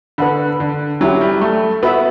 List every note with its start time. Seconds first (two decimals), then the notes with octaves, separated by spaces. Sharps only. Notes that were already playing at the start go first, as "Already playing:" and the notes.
0.18 D3 B4 F#5 B5
0.60 D3
1.01 F#3 C#4 E4 G4
1.21 G3
1.41 A3
1.83 B3 F#4 B4 E5 B5